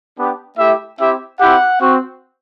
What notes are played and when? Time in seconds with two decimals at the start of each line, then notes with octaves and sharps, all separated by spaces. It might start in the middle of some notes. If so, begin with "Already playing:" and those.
0.17 B3 D4 G4
0.58 A3 E4 G4 E5
0.99 C4 E4 G4 E5
1.40 C4 E4 G4 F#5
1.81 C4 F#4